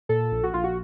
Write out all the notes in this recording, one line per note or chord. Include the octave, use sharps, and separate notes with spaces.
A#2 A4
A#1
F#4
A#1 F4
F#4